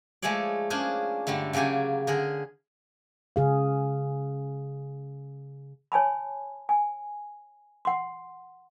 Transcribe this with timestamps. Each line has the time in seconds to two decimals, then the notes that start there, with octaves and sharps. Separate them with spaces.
0.22 F3 G#3 A3 G#4 C#5 D5
0.70 A#3 C#4 D4 G#4 C5
1.27 G2 D3 G3 A3
1.53 C#3 F#3 A#3 G4 G#5
2.07 D3 G#4 A#4
3.36 C#3 G#4 F5
5.92 C#5 G#5 A5 B5
6.69 G#5
7.85 F#5 C6